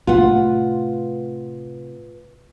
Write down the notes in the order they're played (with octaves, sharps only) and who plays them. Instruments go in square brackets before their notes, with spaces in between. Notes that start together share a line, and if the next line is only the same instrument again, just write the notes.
[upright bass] A2 C3 [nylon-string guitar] F4 B4 F#5